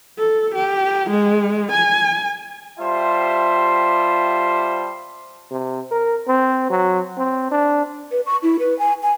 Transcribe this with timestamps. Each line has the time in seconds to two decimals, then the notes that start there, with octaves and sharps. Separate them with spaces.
0.19 A4
0.55 G4
1.10 G#3
1.72 G#5
2.80 G3 F4 G4 C5 E5 A5
5.51 C3
5.91 A#4
6.28 C4
6.70 F#3
7.18 C4
7.52 D4
8.12 B4
8.26 C#6
8.43 E4
8.59 B4
8.79 G#5
9.03 G#5